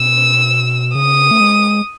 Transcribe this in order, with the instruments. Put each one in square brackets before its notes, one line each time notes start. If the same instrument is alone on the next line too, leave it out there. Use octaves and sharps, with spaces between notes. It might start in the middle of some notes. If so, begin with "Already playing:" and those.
Already playing: [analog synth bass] B2 [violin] E6
[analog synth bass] C#3 [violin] D#6
[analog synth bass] A3
G#3